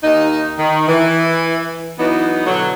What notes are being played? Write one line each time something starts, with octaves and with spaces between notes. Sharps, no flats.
D#2 A#3 D#4
D#3
E3
E3 F#3 B3 D#4
B2 D3 F#3